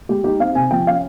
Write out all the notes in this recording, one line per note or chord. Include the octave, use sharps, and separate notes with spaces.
G#3 G4
D#4 G4
C4 F5
C3 G#5
F3 G5
C#4 F5